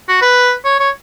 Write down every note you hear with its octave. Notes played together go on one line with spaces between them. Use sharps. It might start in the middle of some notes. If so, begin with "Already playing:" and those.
F#4
B4
C#5
C#5